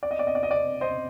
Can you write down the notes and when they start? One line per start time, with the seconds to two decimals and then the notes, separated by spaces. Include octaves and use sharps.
0.03 D5
0.11 D#5
0.19 D5
0.27 D#5
0.35 D5
0.43 D#5
0.51 D5
0.81 C5 D#5